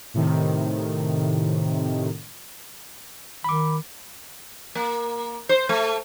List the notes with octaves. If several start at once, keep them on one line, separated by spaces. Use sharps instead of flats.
A2 C3 D#3
D#3 B5 D6
A#3
C5
A3